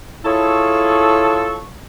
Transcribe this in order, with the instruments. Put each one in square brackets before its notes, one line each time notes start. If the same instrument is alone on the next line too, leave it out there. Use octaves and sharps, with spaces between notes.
[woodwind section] E4 C#5 C#6 [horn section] F4 G#4 A4